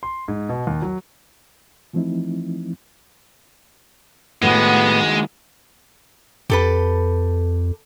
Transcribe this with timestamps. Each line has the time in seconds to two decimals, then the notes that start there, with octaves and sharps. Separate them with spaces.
0.03 C6
0.28 G#2
0.49 B2
0.67 D#2
0.82 F#3
1.93 E3 F3 A3 C4 D#4 E4
4.43 D#2 A2 G#3 B3 F#4
6.50 F2 G4 A4 B4